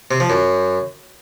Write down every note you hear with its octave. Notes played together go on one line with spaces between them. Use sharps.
C3
F3
F#2